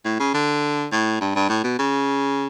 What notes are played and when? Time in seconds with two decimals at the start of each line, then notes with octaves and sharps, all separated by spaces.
0.05 A2
0.20 C#3
0.34 D3
0.92 A2
1.20 G2
1.35 G2
1.49 A2
1.64 B2
1.79 C#3